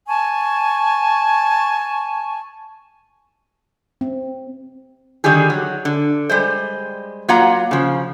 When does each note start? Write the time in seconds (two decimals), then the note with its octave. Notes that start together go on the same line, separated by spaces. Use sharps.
0.07 G#5 A5 C#6
4.01 C4
5.24 D3 D#3 G3 G4 G#4
5.50 F#3
5.85 D3
6.29 G3 G#3 C5
7.29 F#3 A#3 F4 F#5 A#5
7.71 C#3 F3